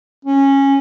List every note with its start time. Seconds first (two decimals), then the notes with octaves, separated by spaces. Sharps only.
0.25 C#4